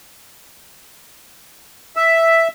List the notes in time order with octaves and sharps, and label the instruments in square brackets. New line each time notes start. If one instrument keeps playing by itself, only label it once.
[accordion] E5